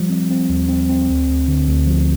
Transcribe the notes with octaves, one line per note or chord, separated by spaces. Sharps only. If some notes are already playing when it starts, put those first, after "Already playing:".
Already playing: F3 G3
C4
C4
D#2
C4
C4
D2
D2
D3
D2
F3